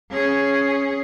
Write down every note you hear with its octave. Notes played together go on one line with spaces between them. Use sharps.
C#4 G#4